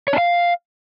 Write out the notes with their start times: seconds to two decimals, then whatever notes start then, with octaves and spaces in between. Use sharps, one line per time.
0.08 C#5
0.13 D4
0.18 F5